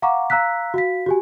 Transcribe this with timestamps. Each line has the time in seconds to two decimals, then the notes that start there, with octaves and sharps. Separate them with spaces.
0.02 F5 F#5 A#5 C#6 D6
0.30 F5 A#5 E6 F#6 B6
0.74 F#4 F5 B6
1.06 F#4 G4 G#5